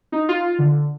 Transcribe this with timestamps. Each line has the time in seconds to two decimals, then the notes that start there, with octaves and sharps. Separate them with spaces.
0.12 D#4
0.29 F4
0.59 D3